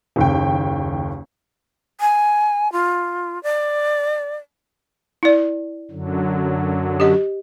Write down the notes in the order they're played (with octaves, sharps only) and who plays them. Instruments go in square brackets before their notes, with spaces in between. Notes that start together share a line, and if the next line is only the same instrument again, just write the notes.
[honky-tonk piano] F#1 D#2 G5
[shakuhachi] G#5
F4
D5
[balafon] E4 D5
[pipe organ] F#2 D3 F#3
[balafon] G4 D#5